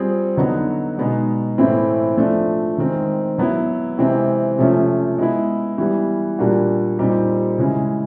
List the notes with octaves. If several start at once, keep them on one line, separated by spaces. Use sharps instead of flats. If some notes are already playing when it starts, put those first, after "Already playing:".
Already playing: G3 C4 F4 G#4
D3 F#3 B3 D#4 F#4
B2 G#3 B3 D#4
A2 E3 A3 C4 E4
F3 A3 D4 F4
D#3 G#3 C4
F#3 B3 E4
C3 E3 G#3 C4
C3 F3 A3 C#4
G#3 B3 E4
E3 G3 B3
A#2 G3 A#3 D4 F#4
A#2 G3 C4 D#4 G4
C#3 E3 G#3